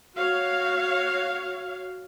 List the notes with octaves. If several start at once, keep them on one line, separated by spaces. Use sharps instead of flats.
F#4 C#5 F5